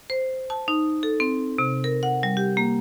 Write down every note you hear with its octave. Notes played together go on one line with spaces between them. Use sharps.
C5
A5
D#4
A4
C4
C3
A#4
F#5
G3
G4
A#3